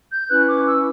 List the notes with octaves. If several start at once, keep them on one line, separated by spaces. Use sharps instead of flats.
G6
C#4 E4 B4 F#6
D6
E6